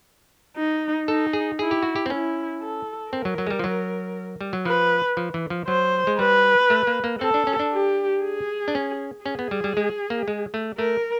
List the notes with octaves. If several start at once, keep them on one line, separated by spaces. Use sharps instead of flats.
D#4
D#4 A4
G#4
E4 G#4
G4
F#4
G4
C4
C#4 E4
A4
C4 A#4
F#3
F#3
G#3
G3
F3
F#3
G3
F#3
F3 B4
F3
E3
F3
F#3 C5
G#3
G3 B4
A3
A#3
A#3
C4 A4
D4
C#4
D4
G4
G#4
D4
C#4
C#4 G#4
B3
G3
G3
G#3
A#3
G#3
A3
A3 A#4